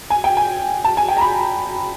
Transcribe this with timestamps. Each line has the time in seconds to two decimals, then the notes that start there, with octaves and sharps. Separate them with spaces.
0.10 G#5
0.24 G5
0.37 G#5
0.84 A5
0.97 G#5
1.08 G5
1.17 A#5
1.21 B5